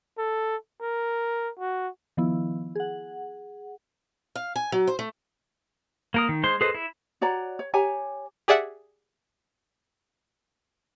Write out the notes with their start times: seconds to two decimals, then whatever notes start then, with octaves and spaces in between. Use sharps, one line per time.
0.18 A4
0.81 A#4
1.59 F#4
2.17 D#3 F3 B3 E4
2.75 G#4 F#5
4.36 F5
4.56 G#5
4.72 F#3
4.87 C5
4.99 A3
6.14 A#3 A#4 D#6
6.29 D#3
6.43 G#3 C5 C6
6.61 G#4 A4 B4 C5 D#5
6.74 E4
7.21 F#4 C#5 D5 A#5
7.59 C#5
7.74 G4 C#5 G#5 A#5
8.48 G4 G#4 D5 E5 F#5